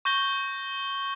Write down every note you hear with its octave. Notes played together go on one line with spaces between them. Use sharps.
C#6 G6 A#6 G7